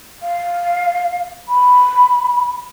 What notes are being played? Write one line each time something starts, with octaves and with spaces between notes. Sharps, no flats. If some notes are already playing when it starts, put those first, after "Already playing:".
F5
B5